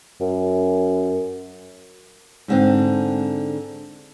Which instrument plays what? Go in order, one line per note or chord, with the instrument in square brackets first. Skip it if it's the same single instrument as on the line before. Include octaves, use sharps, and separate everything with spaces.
[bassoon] F#2
[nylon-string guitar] G#2 D3 C4